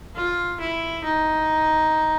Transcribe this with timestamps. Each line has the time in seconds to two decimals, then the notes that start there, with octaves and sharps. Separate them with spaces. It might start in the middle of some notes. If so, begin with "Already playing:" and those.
0.16 F4
0.60 E4
1.04 D#4